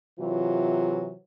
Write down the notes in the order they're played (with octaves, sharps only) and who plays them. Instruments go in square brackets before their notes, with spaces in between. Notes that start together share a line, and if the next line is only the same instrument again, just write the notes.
[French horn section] C3 E3 F#3 F4